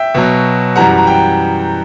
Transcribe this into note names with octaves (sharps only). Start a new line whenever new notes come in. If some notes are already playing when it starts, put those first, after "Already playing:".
Already playing: E5 G5
B2 F#3
F#2 E3 G3 F#5 A#5
A#5
G5